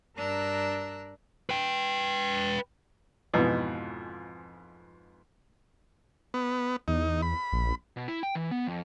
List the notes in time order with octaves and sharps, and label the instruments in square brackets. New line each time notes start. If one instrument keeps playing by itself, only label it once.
[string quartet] G2 D4 A#4 A#5 E6 F#6
[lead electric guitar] B4 G5
[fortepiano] F2 G#2 B2 E3
[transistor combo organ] B3
[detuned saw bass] E2 [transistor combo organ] D#4
[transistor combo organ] B5
[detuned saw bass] A#1
[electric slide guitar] B2
E4
G5
E3
B3
F2